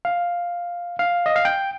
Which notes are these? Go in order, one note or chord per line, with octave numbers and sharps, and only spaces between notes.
F5
F5
D#5
F5
G5